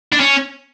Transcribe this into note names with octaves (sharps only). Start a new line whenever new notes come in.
D4
C#4